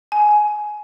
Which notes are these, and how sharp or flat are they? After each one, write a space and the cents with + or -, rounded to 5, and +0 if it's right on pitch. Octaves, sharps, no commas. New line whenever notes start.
G#5 +15